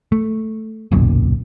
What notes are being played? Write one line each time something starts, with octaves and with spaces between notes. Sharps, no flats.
A3
D1 B1 F#2 A#2